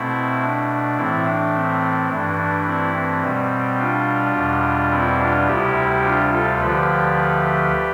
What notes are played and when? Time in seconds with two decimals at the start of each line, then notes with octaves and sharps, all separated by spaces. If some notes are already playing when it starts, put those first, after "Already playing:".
Already playing: B2 A3 C4 E4
0.42 D4
0.97 A2 E3 A3 C4 E4
1.26 D4
1.54 C4
2.09 G2 E3 A3 D4
2.38 D4
2.66 C4 E4
2.94 C4
3.23 B2 G3
3.79 D4 F4
4.35 E2 B2 G3
4.91 C4 E4
5.20 D4 F4
5.47 D2 C3 G3 E4 G4
6.04 D4 F4
6.32 F4 A4
6.60 D2 D3 F3 A3 G4 B4